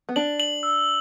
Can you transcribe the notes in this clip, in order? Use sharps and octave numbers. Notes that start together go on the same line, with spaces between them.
B3
D4 F#7
F#7
E6